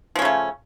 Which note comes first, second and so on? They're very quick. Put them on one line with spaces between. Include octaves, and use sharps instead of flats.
F3 C#4 C#3 A3